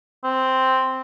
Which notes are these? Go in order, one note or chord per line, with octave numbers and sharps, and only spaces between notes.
C4